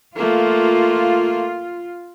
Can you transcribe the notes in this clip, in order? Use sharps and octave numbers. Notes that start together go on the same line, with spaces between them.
A3 A#3 F4